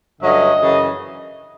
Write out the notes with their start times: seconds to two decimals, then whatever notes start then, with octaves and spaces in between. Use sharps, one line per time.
0.21 G2 D3 F#3 A3 C#4 D#5
0.59 F#2 C#3 E3